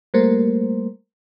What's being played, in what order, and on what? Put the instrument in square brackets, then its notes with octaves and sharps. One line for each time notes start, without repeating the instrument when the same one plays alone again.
[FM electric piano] G3 A3 A#3 A#4 C5